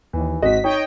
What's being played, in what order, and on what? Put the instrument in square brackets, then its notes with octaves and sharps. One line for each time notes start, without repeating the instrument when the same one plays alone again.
[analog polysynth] D#2 [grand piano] E3
[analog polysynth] G#1 B6 [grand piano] C4 F#4 D#5
[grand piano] D#4 [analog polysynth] C#5 D#5 G5